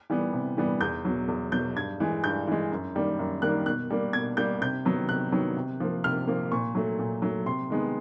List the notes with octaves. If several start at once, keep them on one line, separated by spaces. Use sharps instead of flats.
E3 G3 B3
C3
E3 G3 B3
E2 G6
B2 F#3
E2
B2 F#3 G6
G2 G#6
E3 G#3
G2 G6
E3 G#3
F#2
D#3 G3 A#3
F#2
D#3 G3 A#3 F#6
B2 F#6
G3 A#3
B2 G#6
G3 A#3 G6
C3 G6
D#3 F#3 B3
C3 F#6
D#3 F#3 B3
C3
F3 A#3
C3 F6
F3 A#3
A#2 C#6
F#3 A3
A#2
F#3 A3
C3 C6
D#3 G#3 B3